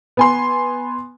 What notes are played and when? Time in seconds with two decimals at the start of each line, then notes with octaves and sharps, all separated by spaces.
0.17 B3 G#5 C6